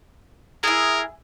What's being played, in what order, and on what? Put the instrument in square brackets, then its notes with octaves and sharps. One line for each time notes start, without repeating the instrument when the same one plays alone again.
[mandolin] E4 G#4 [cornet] A#4